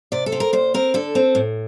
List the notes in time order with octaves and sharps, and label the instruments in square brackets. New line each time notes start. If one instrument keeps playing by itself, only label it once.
[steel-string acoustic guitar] C3 D5
A4
C4
A#4
A#2 C5
C4 A#4
D3 A4
C4
A2